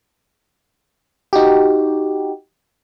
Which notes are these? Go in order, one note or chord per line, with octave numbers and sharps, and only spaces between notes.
D#4 F#4 G4